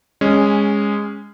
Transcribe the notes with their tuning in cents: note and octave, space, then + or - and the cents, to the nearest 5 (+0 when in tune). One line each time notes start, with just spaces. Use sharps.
G#3 -15 C#4 +0